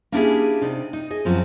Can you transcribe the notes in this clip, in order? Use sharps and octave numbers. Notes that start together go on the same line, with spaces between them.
A#3 C#4 D4 E4 G4 G#4
C3 D#4 D5
D#4
G#4 D#5
F#2 F3 C4